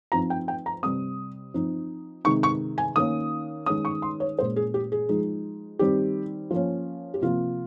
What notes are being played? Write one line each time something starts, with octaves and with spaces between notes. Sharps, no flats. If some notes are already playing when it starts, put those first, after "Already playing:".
F3 C4 D#4 A#5
G5
G5
A#5
C3 G3 C4 D#6
F3 C4 D#4
C3 D#3 G#3 D#4 C#6
C#6
G#5
D#3 A#3 C#4 D#6
D#3 G#3 C#4 D#6
C#6
C6
C#5
A#2 G#3 C#4 C5
G#4
G4
G#4
F3 G#3 D#4
D#3 G3 C4 G4
F3 A#3 C#4
G4
C3 F3 A#3 F4